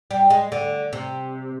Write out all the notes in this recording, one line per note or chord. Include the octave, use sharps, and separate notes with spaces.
G3
G#3
D3
C3